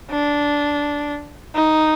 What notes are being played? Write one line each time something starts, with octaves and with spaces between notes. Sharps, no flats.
D4
D#4